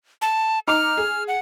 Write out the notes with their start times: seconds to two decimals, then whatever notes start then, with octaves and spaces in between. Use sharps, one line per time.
0.22 A5
0.68 D#4 A#5 D6 F6
0.97 G#4
1.28 F#5